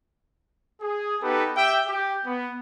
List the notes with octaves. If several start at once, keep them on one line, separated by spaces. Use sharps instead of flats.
G#4
B3 D#4 G4 A4 B4
G4 E5 G5
G4
B3